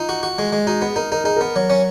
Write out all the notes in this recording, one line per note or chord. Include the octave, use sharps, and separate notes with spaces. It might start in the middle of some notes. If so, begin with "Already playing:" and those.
Already playing: D#4 F4
F#4
F#4
G#3
G#3
D#4 F#4
B3 G#4
D#4 A#4
D#4 A#4
D#4 G#4
B3 A#4
F#3
C#4